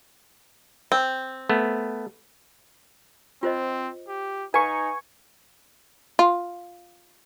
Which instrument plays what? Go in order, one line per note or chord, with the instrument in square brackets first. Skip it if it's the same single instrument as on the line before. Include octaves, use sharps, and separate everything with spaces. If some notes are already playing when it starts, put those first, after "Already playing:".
[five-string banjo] C4
[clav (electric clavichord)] A3 B3
[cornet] C4 [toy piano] F4 C5 D#5
[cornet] G4
[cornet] D#4 [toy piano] B4 F5 A#5 [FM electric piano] G#5 C#6
[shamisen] F4